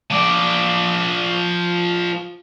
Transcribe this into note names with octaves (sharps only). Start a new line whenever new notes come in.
F3 D5